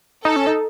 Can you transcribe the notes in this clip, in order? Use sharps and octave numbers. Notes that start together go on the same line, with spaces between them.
D#4 A4
C#4
D#4